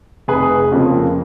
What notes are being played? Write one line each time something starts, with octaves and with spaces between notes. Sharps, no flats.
F1 G#4 B4
F2 C#3 F3 A#3